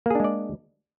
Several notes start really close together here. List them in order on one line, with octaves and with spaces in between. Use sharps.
A#3 G#4 D4 G#3 D5